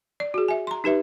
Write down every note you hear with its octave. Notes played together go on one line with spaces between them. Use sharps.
D5
F#4 G#4
E5 G#5
A#5 C6
D#4 G4 B4 E5